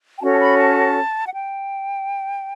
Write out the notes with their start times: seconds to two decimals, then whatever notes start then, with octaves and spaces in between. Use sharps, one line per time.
0.17 G5
0.21 C#4 F#4 A4 C#5 A5
0.33 A5
0.39 B5
0.58 A5
1.27 F#5
1.33 G5